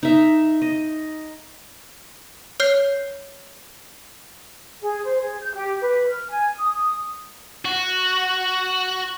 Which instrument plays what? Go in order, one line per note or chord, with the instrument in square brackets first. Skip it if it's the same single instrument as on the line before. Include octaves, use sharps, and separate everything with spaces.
[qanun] D#4 E5
D#5
[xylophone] C#5 F6 G6 C7
[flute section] G#4
C5
G#4
G6
G4
B4
F6
G#5
D#6
[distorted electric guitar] F#4